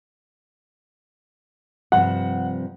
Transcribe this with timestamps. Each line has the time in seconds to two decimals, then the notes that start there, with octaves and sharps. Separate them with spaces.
1.92 G2 C3 F3 F#5